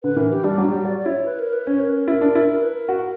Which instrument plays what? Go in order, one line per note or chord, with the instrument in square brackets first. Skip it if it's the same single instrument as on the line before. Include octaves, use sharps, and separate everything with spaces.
[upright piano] D3 [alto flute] B4
[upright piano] E3 [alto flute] A#4
[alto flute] G4
[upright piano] G3 [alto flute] D4
[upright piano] F#3
[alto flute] G4
[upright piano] G3
[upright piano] F#4 [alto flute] D5
[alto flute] D5
[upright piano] E4 [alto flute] C#5
[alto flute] B4
A#4
B4
[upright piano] C#4 [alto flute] C#5
[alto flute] A#4
B4
A#4
[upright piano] E4 [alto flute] A#4
[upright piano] D4
E4
[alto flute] A#4
B4
A#4
[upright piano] F#4